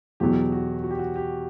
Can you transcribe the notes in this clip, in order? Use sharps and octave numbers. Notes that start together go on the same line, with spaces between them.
E2 B2 F#3 G4
F#4
F#4
G4
F#4
G4